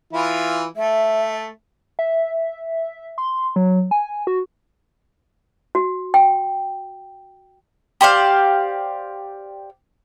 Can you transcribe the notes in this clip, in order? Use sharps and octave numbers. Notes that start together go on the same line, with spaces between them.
E3 E4 F4
A3 E5
E5
C6
F#3
G#5
F#4
F#4
G5
G4 C5 D5 F5